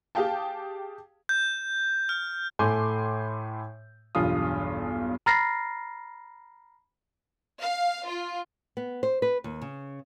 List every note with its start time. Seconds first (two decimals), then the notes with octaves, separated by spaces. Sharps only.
0.15 G4 G#4 F5 G5 A5
1.29 G6
2.09 F6
2.59 A2 A3 G#5 C6 D6 G6
4.15 B1 E2 G2 F4 D#6
5.26 A#5 B5 F6 A6 A#6 C7
7.62 F5
8.07 F4
8.77 B3
9.03 C5
9.22 B4
9.44 D#2
9.62 C#3